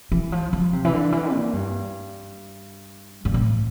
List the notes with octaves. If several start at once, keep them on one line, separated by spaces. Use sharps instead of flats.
E3
F3
F3
C3
E3
D3
E3
A#2
G2
G2
A2